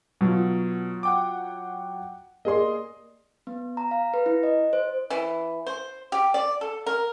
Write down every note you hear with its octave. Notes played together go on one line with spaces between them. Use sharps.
B2 F#3 F4
F#5 G5 D6
A#3 G#4 D5 D#5 C6
B3
A#5
F5
B4
E4
D#5
C5
E3
C5
G4
D5
A4
A#4